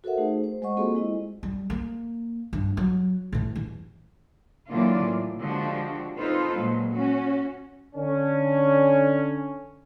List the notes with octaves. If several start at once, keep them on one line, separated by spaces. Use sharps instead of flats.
F#4 A4 A#4 C5 E5 F#5
A3 D#4 G#4 C5
C5
G#3 C5 D#5 F#5 C#6
A#3 C4 F4 F#4 G#4 A4
G#3 E4 D#5
G3
A#3
G2
F#3
A2 E3
E2
D3 E3 F#3 A#3 F4 D5
A2
D3 F3 G#3 D4 F#4 G4
C4 D#4 F4 A4 B4 C5
A#2 F#3 G#3
C#4 F#4
D3 C#4